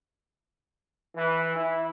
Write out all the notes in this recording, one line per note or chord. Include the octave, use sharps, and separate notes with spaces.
E3
E4